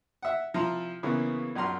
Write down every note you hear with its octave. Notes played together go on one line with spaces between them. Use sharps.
E5 F#5
C3 F3 E4 F4 A#5 C6
C#3 E3 A#3 B3
A#1 F#2 A#5 C6 F6